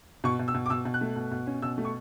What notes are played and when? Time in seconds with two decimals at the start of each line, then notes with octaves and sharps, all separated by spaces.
0.24 B2 C#6
0.39 B2
0.48 E6
0.54 B2
0.66 D6
0.70 B2 E6
0.85 B2
0.94 F#6
1.01 A3
1.16 B2
1.31 B2
1.47 C#4
1.62 B2 E6
1.78 A3
1.85 C#6